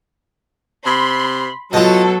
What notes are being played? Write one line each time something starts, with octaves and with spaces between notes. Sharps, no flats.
C3 B5 C6
B2 F#3 F4 A4 D#5